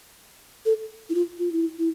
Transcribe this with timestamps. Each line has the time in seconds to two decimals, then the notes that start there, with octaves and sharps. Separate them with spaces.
0.66 A4
1.10 E4
1.15 F4
1.39 F4
1.52 E4
1.79 E4